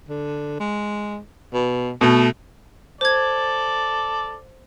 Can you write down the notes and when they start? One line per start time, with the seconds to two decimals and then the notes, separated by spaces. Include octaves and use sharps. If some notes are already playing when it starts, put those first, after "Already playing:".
0.08 D3
0.60 G#3
1.53 B2
2.01 B2 A3
3.01 A4 C5 D5 G#6